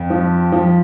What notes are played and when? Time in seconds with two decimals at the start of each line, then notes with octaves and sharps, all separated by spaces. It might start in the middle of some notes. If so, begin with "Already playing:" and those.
Already playing: F2
0.10 F3
0.52 F3